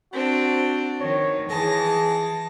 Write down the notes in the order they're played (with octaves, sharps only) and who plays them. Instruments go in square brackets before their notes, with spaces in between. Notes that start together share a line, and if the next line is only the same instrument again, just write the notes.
[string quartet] C4 D4 [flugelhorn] F#4
[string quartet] D#3 [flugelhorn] C#5
[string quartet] E3 A5 A#6 [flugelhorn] G#4